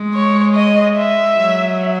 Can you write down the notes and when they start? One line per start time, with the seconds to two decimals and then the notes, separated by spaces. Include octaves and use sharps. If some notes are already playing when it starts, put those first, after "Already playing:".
Already playing: G#3
0.14 C#5
0.55 D#5
0.97 E5
1.37 F#3